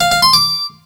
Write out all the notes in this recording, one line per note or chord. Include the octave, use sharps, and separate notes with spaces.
F5
F5
C6
D6